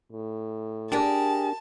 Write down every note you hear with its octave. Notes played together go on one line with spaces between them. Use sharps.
A2
D4 G4 G#4 A#4 A5